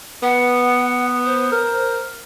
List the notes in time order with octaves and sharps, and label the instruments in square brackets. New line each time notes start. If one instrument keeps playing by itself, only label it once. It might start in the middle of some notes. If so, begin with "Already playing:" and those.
[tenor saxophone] B3 [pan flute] F#5
[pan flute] C5
[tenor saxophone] A#4